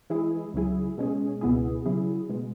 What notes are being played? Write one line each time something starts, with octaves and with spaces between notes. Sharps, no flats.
E3 G#3 E4 G#4
C#2 C#3 F#3 E4 G#4
B2 G#3 C#4 G#4
C#2 B2 B3 E4 G#4
C#3 F#3 E4 G#4
B2 G#3